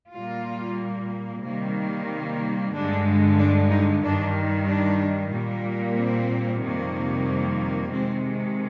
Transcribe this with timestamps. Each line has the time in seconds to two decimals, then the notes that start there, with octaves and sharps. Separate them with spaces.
0.13 A#2 G3 A#3 F4
1.43 C3 D#3 G3 A#3
2.73 G2 D3 G#3 D4
3.38 D4
3.70 D#4
4.02 G2 D#3 G3 D4
4.67 D4
5.32 A#2 G3 A#3
5.97 C4
6.62 F2 C3 D#3 G3 A#3
7.92 C3 D#3 G#3 C4